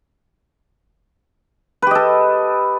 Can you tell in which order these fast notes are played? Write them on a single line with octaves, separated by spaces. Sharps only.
B4 G4 D#5 A4